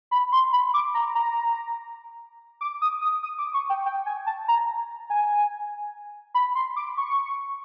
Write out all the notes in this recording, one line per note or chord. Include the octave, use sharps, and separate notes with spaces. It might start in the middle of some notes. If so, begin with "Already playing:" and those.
B5
C6
B5
D6
A#5
A#5
D6
D#6
D#6
D#6
D6
C#6
G5
G5
G#5
A5
A#5
G#5
B5
C6
D6
C#6